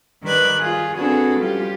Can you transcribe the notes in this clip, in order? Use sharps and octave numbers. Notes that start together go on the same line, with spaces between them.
D#3 G3 B4 D5 F#6 G#6
F4 G#4
C4 D4 F#4 G#4 A4 B4
G3 C#4 F4 G4